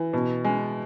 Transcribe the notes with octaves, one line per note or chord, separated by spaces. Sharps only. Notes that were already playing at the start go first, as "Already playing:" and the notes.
Already playing: E3
B2
G#3